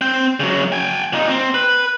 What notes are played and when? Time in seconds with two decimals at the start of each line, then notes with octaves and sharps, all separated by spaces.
0.01 C4 G5
0.40 C#3 F#3
0.72 G5 G#5
1.13 A#2 D#4
1.29 C4
1.54 B4